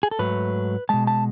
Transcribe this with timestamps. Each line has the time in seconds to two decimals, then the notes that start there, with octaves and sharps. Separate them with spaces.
0.03 G#4
0.11 A4
0.19 G#2 F#3 A3 B4
0.89 B2 G#3 A5
1.07 A5